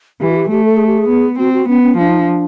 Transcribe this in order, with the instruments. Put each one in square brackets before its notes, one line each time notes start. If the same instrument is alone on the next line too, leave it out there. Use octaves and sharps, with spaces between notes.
[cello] E3 [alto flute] G4
[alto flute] F#4
G4
[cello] A3 [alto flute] G4
[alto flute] A4
G#4
G4
G#4
[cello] B3
[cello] C4 [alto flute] F#4
[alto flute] F#4
[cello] B3 [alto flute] C#4
[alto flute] C#4
[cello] F3 [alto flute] D4
[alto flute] D#4
D4